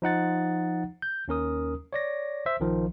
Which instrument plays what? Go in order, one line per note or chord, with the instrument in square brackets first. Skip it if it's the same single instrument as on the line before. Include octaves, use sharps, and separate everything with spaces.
[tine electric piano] F3 D#4 F#5 A6
G6
D#2 C#4 A#4 D#6
C#5 D5 A#6
C5 E5
A#1 D#3 F3